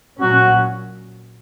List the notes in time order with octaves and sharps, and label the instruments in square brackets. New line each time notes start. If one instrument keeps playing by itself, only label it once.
[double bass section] A#2 F#3 C#4 [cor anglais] F#4